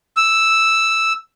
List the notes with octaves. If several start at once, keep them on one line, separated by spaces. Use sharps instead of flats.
E6